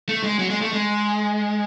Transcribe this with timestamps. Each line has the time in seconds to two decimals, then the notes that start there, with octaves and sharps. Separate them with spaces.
0.09 A3
0.24 G#3
0.39 F#3
0.50 G#3
0.62 A3
0.73 G#3